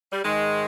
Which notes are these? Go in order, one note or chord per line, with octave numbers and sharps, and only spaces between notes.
G3
G#2 D#3 G#3